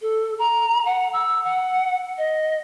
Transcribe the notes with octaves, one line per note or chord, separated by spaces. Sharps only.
A4
A#5
F#5
E6
F#5
D#5